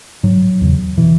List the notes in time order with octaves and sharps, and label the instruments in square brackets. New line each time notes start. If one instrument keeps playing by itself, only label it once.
[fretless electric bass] G#2 F#3
E2 C#3
B2 E3